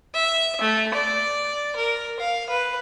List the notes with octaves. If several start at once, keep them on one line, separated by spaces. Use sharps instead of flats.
E5
A3
D5
A#4
F5
B4